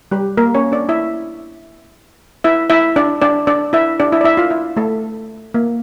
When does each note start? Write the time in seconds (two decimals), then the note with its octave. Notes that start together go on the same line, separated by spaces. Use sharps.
0.11 G3 G4
0.37 A#3 A#4
0.55 C#4 C#5
0.72 D4 D5
0.89 E4 E5
2.44 E4 E5
2.70 E4 E5
2.96 D4 D5
3.22 D4 D5
3.47 D4 D5
3.73 E4 E5
4.00 D4 D5
4.12 E4 E5
4.21 D5
4.24 E4 E5
4.37 F4 F5
4.50 E4 E5
4.77 A3 A4
5.54 A#3